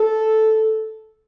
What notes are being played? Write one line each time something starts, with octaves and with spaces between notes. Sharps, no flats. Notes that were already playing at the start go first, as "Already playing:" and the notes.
Already playing: A4